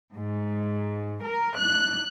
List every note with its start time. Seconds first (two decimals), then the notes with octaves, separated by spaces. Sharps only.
0.17 G#2
1.25 A#4
1.58 F#6